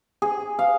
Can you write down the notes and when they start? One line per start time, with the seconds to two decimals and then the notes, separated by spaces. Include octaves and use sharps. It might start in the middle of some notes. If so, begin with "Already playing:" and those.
0.22 G#4
0.59 F5